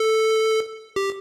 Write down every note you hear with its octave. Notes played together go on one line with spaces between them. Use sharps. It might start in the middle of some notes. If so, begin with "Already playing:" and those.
Already playing: A4
G4